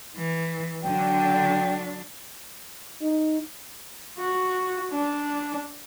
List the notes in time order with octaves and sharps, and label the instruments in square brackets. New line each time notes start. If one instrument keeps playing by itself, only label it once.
[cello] E3
[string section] D3 [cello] F#3 D4 [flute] G5
[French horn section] D#4
[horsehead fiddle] F#4
D4